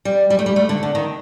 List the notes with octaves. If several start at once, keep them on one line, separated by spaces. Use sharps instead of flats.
G3
G3
A3
G3
A3
D3
D3
D#3